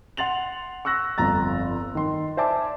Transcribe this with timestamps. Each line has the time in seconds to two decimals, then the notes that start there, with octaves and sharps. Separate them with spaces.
0.17 F#5 C6 A6 F7 F#7
0.85 C#6 E6 F#6 A#6
1.18 G1 F2 A#5 A6
1.95 D#3 C6
2.37 C5 D5 E5 G#5 A5 D6